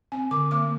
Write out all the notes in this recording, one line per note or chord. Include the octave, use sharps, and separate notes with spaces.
C4 G#5
D3 D6
A#3 D6